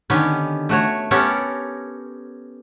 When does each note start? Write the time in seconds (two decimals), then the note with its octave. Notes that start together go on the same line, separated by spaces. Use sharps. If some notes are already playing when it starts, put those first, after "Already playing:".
0.10 D3 D#3 B3 C#4 G4
0.69 A3 F#4 C#5
1.11 B3 C#4 G4 A4 A#4 C#5